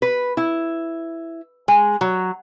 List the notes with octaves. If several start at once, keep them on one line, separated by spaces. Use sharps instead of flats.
B4
E4
G#3
F#3